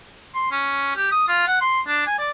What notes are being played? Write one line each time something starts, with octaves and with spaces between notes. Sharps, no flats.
C6
C#4
G4
D#6
F4
F#5
C6
D4
G#5
D5